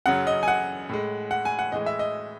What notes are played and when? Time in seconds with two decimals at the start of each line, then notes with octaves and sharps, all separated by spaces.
0.06 F#2 C#3 F#3 F#5
0.27 D#5
0.43 G#5
0.48 F#5
0.89 A2 G#3
1.31 F#5
1.45 G#5
1.59 F#5
1.72 A2 E3 G#3 D#5
1.86 E5
1.99 D#5